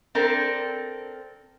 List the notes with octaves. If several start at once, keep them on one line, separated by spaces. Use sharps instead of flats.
C4 D4 A4 A#4